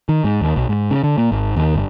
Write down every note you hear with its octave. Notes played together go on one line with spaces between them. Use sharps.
D#3
G#2
D#2
B1
G#2
C#3
D3
A#2
G#1
D#2
G1